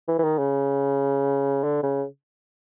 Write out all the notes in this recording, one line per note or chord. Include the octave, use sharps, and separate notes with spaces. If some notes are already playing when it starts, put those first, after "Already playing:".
E3
E3
D#3
C#3
D3
C#3